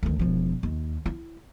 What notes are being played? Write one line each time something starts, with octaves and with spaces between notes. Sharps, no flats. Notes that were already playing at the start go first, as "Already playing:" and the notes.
D2 D#3
E1 F3
D#2
E4